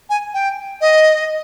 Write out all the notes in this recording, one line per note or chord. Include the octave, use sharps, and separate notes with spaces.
G#5
G5
D#5